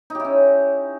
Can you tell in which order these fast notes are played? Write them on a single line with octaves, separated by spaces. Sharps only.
D#4 G4 E4 C#4